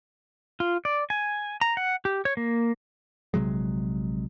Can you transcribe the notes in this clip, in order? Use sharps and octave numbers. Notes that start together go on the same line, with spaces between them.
F4
D5
G#5
A#5
F#5
G4
C#5
A#3
A#1 C3 F#3 G#3